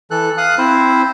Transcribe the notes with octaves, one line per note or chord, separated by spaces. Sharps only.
E3 A4 F#6
F5 D#6 F#6
C4 E4 C5